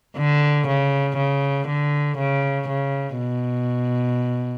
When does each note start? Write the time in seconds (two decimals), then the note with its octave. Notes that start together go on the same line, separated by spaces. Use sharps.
0.17 D3
0.67 C#3
1.17 C#3
1.67 D3
2.17 C#3
2.68 C#3
3.18 B2